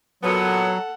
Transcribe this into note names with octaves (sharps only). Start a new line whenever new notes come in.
A#2 F#3 B3 A4 C#5 F#5